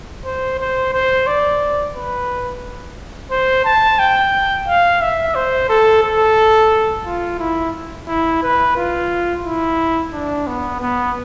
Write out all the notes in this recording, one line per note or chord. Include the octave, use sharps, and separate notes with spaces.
C5
C5
C5
D5
B4
C5
A5
G5
F5
E5
C5
A4
A4
F4
E4
E4
B4
F4
E4
D4
B3
B3